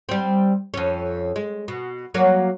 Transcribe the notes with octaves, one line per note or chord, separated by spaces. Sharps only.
G3 C4
F2 C#4
G#3
B2
F#3 A#3 C#5